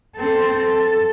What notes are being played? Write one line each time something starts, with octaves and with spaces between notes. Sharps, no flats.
C4 A4
A4